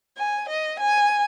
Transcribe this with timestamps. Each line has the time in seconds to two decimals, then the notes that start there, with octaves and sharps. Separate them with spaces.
0.17 G#5
0.49 D#5
0.80 G#5